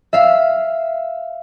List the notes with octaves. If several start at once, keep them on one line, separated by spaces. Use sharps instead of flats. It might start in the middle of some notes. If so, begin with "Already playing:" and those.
E5 F5 B6